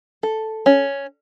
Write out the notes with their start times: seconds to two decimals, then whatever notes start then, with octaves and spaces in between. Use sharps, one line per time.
0.23 A4
0.66 C#4